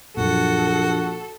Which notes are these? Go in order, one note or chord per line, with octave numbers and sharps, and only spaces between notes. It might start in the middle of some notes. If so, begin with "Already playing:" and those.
A#1 F#2 A#2 F#4 A4